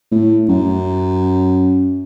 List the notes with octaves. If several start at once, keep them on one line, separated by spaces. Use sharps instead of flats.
A2
F#2